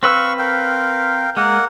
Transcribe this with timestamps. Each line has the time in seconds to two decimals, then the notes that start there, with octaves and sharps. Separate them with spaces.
0.03 C4 B4 F5 C#6 E6
0.39 A#4 F5 G5
1.37 G#3 A#3 A#4 F#5